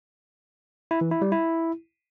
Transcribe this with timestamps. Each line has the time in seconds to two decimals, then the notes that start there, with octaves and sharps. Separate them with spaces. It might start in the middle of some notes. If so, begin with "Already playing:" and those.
0.91 E4
1.01 E3
1.11 E4
1.22 G3
1.32 E4